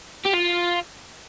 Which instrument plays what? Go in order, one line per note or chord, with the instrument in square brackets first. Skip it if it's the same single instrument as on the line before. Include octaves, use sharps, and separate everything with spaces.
[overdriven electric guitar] G4
F4